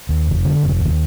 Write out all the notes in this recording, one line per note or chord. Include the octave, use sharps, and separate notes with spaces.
D#2
F1
D3
F1
D#2